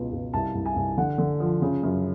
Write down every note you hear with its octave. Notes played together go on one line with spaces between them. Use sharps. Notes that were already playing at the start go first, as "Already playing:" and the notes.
Already playing: C#2 B2
C#2
C2 A5
C2
G#5
C2
D3 F#5
D3
F3
C#3
F#2